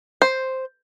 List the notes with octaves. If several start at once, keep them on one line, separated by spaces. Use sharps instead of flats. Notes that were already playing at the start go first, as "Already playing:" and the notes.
C5